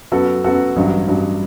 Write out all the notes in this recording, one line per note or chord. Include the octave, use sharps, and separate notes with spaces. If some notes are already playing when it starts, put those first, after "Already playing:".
F#2 F#3 B3 F#4 A4
F#2 F#3 B3 F#4 A4
A1 G2 F#3
A1 G2 F#3